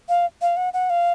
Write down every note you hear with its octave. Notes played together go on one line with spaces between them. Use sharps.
F5
F5
F#5
F#5
F5